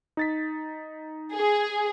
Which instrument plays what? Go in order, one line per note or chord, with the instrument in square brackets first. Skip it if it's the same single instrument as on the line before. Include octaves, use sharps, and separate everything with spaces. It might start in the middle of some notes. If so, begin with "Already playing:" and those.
[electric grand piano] D#4 A6 B6
[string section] G#4